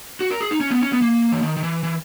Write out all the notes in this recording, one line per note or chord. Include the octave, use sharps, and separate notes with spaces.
F#4
A#4
G#4
D#4
C#4
B3
C#4
B3
A#3
E3
D#3
D#3
E3
E3